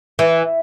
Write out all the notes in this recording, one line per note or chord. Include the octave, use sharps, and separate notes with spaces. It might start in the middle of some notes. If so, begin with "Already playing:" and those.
E3